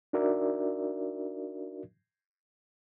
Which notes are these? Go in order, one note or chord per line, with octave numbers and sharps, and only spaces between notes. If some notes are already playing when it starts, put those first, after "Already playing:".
D4 D#4 F#4 A#4 D5 E5